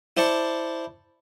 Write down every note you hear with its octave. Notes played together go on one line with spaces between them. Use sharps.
E4 C5 D5 A5 C#6